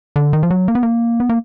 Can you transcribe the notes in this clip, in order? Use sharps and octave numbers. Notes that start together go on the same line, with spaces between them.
D3
D#3
F3
F#3
A#3
B3
A#3
B3
A#3